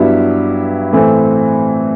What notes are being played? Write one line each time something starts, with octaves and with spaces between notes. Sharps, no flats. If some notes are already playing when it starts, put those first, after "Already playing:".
Already playing: G2 F#3 B3 E4 G4
A2 E3 A3 C4